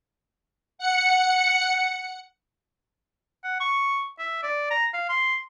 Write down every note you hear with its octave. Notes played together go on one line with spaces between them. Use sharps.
F#5 C#7
F#5
C#6
E5
D5
A#5
F5
C6